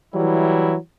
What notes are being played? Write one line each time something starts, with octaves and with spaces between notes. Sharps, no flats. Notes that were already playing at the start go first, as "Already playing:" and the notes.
E3 F#3 G3 E4